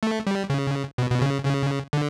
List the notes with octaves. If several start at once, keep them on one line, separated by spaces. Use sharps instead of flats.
A3
G3
C#3
B2
B2
C#3
C#3
D3